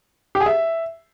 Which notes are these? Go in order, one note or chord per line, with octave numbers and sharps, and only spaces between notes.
G4
G#4
E5